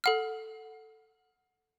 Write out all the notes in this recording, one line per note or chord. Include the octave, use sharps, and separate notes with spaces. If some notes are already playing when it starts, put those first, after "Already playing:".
A4 F#5 F6